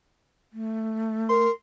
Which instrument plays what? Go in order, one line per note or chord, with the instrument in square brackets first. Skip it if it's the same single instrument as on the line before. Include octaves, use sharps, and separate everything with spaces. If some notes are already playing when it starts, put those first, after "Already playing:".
[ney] A3
[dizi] A#4 [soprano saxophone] C6